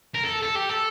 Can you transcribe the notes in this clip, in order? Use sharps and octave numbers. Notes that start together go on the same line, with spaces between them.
A#4
A4
A4
G4
A4